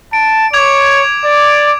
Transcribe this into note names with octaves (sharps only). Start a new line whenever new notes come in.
A5 D7
C#5 D6 G#6 F7
D5